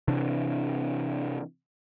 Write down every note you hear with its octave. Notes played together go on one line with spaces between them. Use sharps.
C3 E3 D4